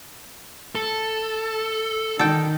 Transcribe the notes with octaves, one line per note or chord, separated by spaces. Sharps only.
A4
D#3 A4 G5